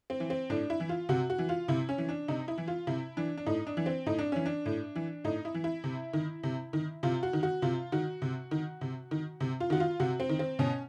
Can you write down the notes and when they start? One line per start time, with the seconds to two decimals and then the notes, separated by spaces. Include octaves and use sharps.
0.10 C4
0.20 E3
0.30 C4
0.50 A2 D4
0.70 E4
0.80 E3
0.89 F4
1.09 C3 F#4
1.30 F#4
1.38 E3
1.49 F4
1.68 C3 E4
1.89 C#4
1.98 E3
2.09 D4
2.28 C3 D#4
2.48 E4
2.58 E3
2.68 F4
2.87 C3 E4
3.17 E3 D4
3.37 D4
3.46 A2 D#4
3.67 D4
3.77 E3
3.86 C4
4.06 A2 D#4
4.19 D4
4.32 E3 C#4
4.46 D4
4.66 A2
4.95 E3
5.24 A2 D#4
5.45 E4
5.54 E3
5.64 E4
5.84 C3
6.13 D#3
6.43 C3
6.73 D#3
7.03 C3 F4
7.23 F#4
7.33 D#3
7.43 F#4
7.62 C3 F4
7.92 D#3 F#4
8.22 C3
8.51 D#3
8.81 C3
9.11 D#3
9.40 C3
9.60 F4
9.70 D#3 F#4
9.80 F4
10.00 C3 F#4
10.20 C4
10.29 D#3
10.39 C4
10.59 B2 C#4